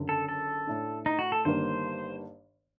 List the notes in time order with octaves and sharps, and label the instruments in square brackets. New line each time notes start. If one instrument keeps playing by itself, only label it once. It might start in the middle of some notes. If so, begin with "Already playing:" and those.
Already playing: [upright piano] F#1 F#2 D3
[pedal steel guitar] A4
A4
[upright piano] A2 A3 D4
[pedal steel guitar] D#4
F#4
A4
[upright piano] G1 G2 D#3 G3 A#3 [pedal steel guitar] C5